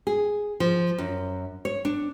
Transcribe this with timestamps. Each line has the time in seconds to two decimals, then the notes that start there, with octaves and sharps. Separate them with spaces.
0.07 G#4
0.60 F3
0.98 F#2
1.65 C#5
1.85 D4